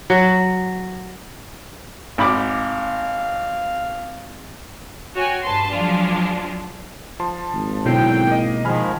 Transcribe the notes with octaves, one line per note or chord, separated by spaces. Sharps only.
F#3
G#1 F5 B5 D6
F#4 C#5 G5 G#5
G2 B4 A5 C6
F3 F#3 G#3 D4 F4
F3 A5 C6
G#1
B2 D3 F#3 C4 E4 G5 C7
A#3 D#5
D#3 F3 G#3 G#5 B5 F6